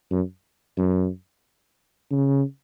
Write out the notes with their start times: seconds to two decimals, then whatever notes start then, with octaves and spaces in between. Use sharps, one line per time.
0.11 F#2
0.78 F#2
2.11 C#3